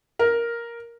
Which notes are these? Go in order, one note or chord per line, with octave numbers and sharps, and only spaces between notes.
A#4